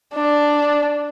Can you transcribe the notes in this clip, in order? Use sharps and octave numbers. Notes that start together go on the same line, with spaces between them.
D4